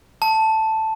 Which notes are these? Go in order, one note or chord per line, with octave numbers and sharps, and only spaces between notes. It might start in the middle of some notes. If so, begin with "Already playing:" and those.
A5